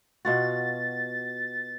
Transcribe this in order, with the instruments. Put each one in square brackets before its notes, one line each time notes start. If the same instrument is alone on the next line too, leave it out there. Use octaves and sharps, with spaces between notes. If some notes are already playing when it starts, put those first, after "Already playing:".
[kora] B2 F4 F#4 [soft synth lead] A6